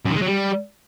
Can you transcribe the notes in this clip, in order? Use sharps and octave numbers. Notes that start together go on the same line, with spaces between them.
F#2
D#3
G#3
F#3
G3